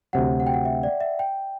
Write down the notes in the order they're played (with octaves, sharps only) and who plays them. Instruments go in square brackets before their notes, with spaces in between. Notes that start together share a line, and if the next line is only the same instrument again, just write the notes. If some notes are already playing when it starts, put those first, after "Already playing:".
[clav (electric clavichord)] D2 C3 F#3 [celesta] F#5
[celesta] F#5
G5
F#5
E5
D5
E5
G5